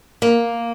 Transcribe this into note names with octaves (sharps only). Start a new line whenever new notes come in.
A#3